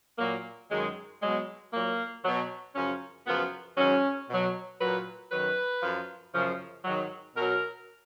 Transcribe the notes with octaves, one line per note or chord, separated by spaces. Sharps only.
A#2 F#3 A#3
F#2 D#3 F#3 G#3
B2 F#3 G#3
A#2 F#3 A#3
B2 F#3
F#2 C#3 F3 C#4
F#2 C#3 F3 B3
G#2 D#3 F#3 C#4
B2 F#3
A#2 F#3 B4
F#2 D#3 F#3 B4
F#2 F3
F#2 C#3 F3
G#2 D#3 F#3
B2 F#3 A#4